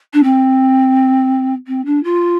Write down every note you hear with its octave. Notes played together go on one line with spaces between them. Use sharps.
D4
C4
C4
D4
F4